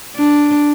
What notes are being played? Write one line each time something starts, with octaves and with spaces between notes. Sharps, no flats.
D4